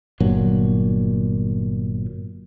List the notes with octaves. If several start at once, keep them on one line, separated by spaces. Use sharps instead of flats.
G1 A#2 F#3